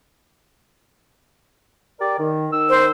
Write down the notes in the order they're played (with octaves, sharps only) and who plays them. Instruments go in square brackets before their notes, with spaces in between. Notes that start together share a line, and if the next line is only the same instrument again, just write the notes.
[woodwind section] G4 A#4 D5
D#3
D#3 E6
[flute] C5